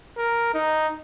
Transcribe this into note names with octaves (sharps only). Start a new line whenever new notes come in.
A#4
D#4